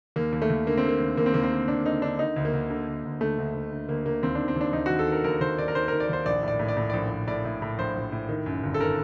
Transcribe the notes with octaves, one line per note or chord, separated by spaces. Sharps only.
D#2 A#3
D#2
A3
D#2
D3 A#3
C4
D3
A#3
D#2
D#2 A#3
C4
D#2 A#3
C4
D3
D3 D4
D3 D#4
D3 D4
D3 D#4
D2
A#3
D2
D3
D2
D2
D2 A3
D2
D2
D3
D2 A#3
D2 A#3
D#2 C4
D4
D#3
C4
D#2 D4
D#2 D#4
F#4
D#2
A4
D#3
A#4
D#2 A#4
D#2 C5
D#3 D5
A#4
D#3 C5
A#4
D#3
D5
D#2 C5
A#1 D5
A2 D5
A2
D5
A2
A#1 D5
A#1
A2 D5
A2
A2
A#1 C5
A#1
A2
D#3
F#2
G1
A4
D#3 A#4